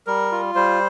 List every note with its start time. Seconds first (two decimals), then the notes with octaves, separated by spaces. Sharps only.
0.07 G3 A#4
0.32 F4
0.55 G3 C5